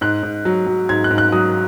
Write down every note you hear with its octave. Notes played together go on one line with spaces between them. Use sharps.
G#2 F#6
G#2
F#3
F#3
G#2 G#6
F#6
G#2
F#6
F#3 D#6